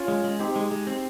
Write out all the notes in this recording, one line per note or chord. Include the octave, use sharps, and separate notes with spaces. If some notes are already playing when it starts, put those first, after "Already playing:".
Already playing: C#4 F4
G#3
G#3
C4 D#4 G4
G#3
G#3
C4